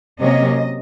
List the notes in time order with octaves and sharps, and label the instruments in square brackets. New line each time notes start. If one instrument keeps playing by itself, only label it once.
[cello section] C3 F#3 A#3 C#4 D#5